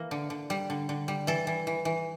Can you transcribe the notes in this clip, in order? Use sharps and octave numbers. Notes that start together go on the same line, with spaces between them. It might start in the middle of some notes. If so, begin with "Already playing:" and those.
Already playing: E3 A#3
D3
D3
G3
D3
D3
G3
E3 A4
E3
E3
E3